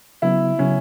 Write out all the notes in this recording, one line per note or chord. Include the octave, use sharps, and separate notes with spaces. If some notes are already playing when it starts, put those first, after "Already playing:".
C#3 F#3 B3 E4
C#3 F#3 B3 C#4